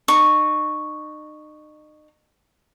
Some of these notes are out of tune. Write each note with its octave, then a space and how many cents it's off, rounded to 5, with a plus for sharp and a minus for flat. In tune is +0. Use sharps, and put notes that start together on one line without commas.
D#4 -35 C#6 +0